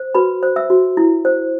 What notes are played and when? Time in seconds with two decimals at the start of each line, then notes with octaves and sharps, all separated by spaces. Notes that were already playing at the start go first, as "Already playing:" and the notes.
Already playing: C5
0.15 F#4 B4 B5
0.43 C5
0.56 E5 E6
0.70 F#4
0.97 E4
1.25 C5